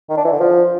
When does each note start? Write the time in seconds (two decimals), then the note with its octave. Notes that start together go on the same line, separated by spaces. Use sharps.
0.09 D#3
0.17 D4
0.25 E3
0.32 D3
0.40 F3